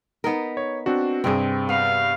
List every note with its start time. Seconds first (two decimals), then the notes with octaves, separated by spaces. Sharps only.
0.24 B3 D#4 A#4
0.57 C#5
0.86 C4 D4 F#4
1.24 G2 C3 C4 G#4
1.69 B3 F5